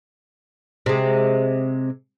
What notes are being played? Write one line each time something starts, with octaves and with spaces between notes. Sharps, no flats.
C3 G#3